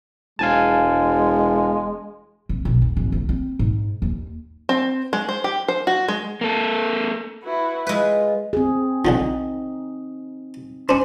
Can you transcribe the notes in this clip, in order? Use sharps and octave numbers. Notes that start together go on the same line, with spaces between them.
E1 G#3 F5 G#5 A5
C3
B1
E2
G#1
C2
C4
G#2
D#2
C4
G#3
C5
G4
C5
F#4
G#3
A#3 A4
E4 F#4 B4
G#3 F4 B4
C4 G#4
B1 D3 F3 D#4
C#4 D4 C5